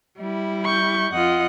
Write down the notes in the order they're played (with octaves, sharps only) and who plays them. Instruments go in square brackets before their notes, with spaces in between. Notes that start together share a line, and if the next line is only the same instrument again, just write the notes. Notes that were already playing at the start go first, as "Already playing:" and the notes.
[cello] G3 E4
[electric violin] C#6 G6
[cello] F2 F#5 [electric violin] F4 D#5